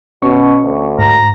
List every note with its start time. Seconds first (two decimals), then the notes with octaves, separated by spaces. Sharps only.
0.22 B2 C#4 C#6
0.63 D2
0.99 G#2 A#5